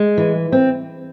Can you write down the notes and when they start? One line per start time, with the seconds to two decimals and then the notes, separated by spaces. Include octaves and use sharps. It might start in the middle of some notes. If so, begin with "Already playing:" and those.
Already playing: G#3
0.18 E3
0.52 C4